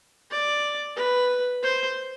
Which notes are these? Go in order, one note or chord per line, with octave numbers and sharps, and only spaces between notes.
D5
B4
C5